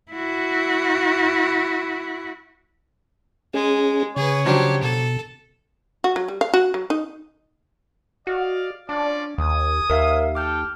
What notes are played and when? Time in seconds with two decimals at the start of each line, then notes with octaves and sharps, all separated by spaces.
0.12 E4 F#4
3.54 G#3 C#4 G#4
4.16 C#3 G#4 B4 C#5
4.46 F3 F#3 D4 G4
4.83 B2 A4
6.04 F#4
6.16 F#3
6.28 G3
6.41 F5
6.54 F#4
6.74 F#3
6.90 D#4
8.27 F#4 D5 D#5 F5
8.89 C#4 D4 F4 D5
9.38 D#2 G#5 D#6
9.90 D#2 A#4 E5 F5
10.35 A4 G5 A5 D6 F6 G6